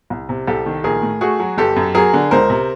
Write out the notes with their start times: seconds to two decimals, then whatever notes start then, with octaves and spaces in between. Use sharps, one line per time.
0.10 C2
0.29 C3
0.47 C2 G4 A4
0.66 D#3
0.84 A#1 G#4 A#4
1.03 A2
1.21 A3 F#4 G#4
1.40 F#3
1.58 G1 G4 A4
1.76 F#2
1.95 F#3 G#4 A#4
2.14 D3
2.31 C#2 A#4 C5
2.50 C3